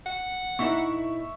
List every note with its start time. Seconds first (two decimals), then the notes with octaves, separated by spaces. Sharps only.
0.06 F#5
0.59 A#2 D#4 E4 E5 C#6